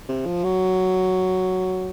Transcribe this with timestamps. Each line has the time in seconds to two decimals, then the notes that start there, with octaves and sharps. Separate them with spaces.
0.09 C3
0.26 F3
0.44 F#3